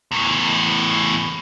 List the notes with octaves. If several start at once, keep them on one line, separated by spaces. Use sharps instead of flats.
E2 A2